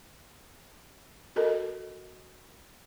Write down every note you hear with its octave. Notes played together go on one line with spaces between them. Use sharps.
F#4 A4 A#4 D#5